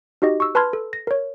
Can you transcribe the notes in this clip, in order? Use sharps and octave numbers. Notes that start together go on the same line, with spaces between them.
D#4 F#4 G4 D#5
C#6 E6
B4 A5 B5 C6 F6 G#6
A4
A#6
A#4 C#5